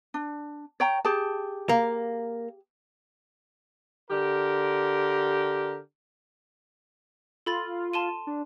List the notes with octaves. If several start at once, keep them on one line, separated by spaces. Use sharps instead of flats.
D4
C#5 G5 A#5
G4 G#4 A5
A#3
D3 G4 A#4
F4 A4 B5 A6
A5 C6 D#7
D4